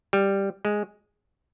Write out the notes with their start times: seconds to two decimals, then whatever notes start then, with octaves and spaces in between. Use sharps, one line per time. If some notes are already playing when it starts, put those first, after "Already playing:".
0.13 G3
0.65 G#3